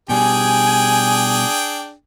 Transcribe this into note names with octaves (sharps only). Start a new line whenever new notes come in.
B2 G3 D4 G#4 G5 G#5